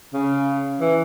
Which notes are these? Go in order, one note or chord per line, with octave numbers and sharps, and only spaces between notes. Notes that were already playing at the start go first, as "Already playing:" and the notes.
C#3
E3